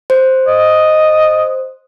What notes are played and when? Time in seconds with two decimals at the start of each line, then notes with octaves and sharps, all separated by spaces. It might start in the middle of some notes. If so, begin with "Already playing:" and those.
0.10 C5
0.47 D#5